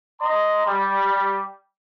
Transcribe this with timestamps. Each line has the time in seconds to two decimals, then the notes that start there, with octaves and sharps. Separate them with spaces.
0.21 D#5 A#5 C6
0.67 G3